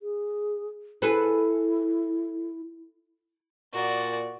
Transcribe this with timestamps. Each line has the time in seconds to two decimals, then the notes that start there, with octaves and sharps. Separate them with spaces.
0.01 G#4
1.02 E4 G#4 A4 B4
3.74 A#2 F#4 D5